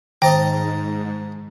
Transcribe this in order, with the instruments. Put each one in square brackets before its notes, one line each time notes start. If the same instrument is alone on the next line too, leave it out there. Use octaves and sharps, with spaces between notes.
[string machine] G#2 [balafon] D#3 C5 [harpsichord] D#5 A5 A#5 [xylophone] G5